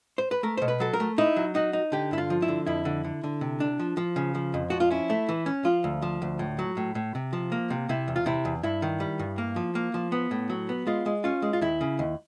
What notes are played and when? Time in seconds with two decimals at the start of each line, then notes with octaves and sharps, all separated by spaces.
0.18 C5
0.31 B4
0.43 A3 A#4
0.57 B2 C5
0.68 B4
0.80 F#3 A4
0.93 A#4
1.00 A3
1.18 D#4 E4
1.36 F#3
1.55 D#4 F#4
1.73 D#4
1.92 D3 G4
2.11 G2 E4
2.18 F4
2.30 F3
2.42 E4
2.48 D3
2.66 F2 E4
2.85 D3
3.04 D3
3.23 D3
3.41 C3
3.60 D4
3.79 F3
3.97 F3
4.16 C#3
4.35 F3
4.54 F2
4.70 F3 F#4
4.80 F4
4.90 C#4 E4
5.10 A3
5.29 E3
5.46 C#4
5.64 F3 F4
5.84 D2
6.02 F3
6.22 D2
6.39 A2
6.59 F#3
6.77 A2
6.95 A2
7.15 C3
7.33 F3
7.52 A#3
7.70 C3
7.89 C3 E4
8.08 E2
8.16 F4
8.26 C3 E4
8.45 E2
8.63 G2 E4
8.82 D#3
9.00 G3
9.19 G2
9.38 A#3
9.56 F3
9.75 A#3
9.94 F3
10.12 B3
10.31 A2
10.50 F#3
10.69 B3
10.87 G#3 F4
11.06 G#3
11.24 C#4 F4
11.42 G#3
11.53 F4
11.61 D#2 E4
11.81 C#3
11.99 D#2